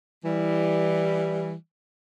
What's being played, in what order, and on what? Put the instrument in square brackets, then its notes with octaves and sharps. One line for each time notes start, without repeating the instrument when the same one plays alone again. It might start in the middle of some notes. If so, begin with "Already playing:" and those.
[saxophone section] E3 G3